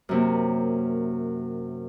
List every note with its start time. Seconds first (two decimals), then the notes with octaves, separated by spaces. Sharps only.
0.09 F#2 C3 A#3